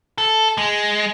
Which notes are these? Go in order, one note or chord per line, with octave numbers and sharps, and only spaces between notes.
A4
G#3